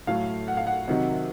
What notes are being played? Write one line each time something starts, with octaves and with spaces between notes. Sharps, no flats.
A2 F#3 A3 F5
F#5
F5
F#5
C3 D#3 F#3